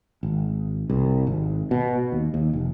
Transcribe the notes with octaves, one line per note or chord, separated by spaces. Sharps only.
G#1
C2
G#1
B2
D#2
D#2
F1